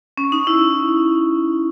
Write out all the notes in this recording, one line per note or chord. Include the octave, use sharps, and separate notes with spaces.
C#4
D#4
E4